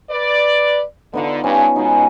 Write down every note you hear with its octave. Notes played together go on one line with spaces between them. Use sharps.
B4 D5
D3 B3 D#4 F4
G2 C#4
B2 G#3 D#4